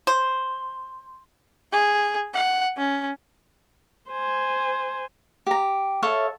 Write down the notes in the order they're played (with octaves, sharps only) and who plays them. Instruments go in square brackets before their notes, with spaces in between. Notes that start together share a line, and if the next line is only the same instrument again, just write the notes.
[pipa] C5
[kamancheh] G#4
F#5
C#4
[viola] C5 G#5
[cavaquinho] G4 A#5
A4 C#5 E5 F5